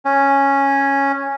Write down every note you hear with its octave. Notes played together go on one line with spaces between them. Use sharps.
C#4